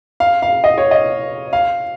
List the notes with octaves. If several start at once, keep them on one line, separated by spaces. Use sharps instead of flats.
F5
F5
D#5
C#5
D#5
F5